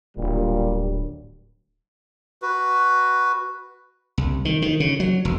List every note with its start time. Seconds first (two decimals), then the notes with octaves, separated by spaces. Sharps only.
0.17 D1 A#2 G3
2.42 F#4 B4
4.18 C2
4.45 D#3
4.62 D#3
4.80 C#3
5.00 F#3
5.25 F1